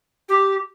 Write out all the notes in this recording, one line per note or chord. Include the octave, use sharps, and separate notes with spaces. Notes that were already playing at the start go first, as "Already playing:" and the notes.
G4